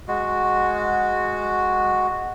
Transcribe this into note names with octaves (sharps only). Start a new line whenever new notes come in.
G#3 F#4